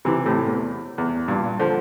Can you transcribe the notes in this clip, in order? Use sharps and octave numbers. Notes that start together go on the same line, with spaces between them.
C3 E3
A2 C3
E2
E2
G2 A#2
D3 F3